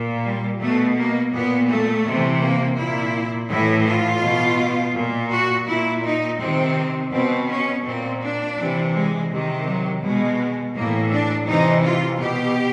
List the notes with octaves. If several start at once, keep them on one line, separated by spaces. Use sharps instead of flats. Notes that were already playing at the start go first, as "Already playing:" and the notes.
Already playing: A#2
G3
B2 A3
A#3
A#2 B3
A3
C3 E3
A#3
A#2 E4
A2 E3 E4
F4
B2
A#2
F#4
A#2 E4
D#4
C3 D#3 C4
B2 C4
C#4
A#2 C4
D4
C3 E3
G#3
C3 D#3
F#3
B2 G#3
A2 E3 A#3
D4
C3 E3 D#4
F4
B2 G4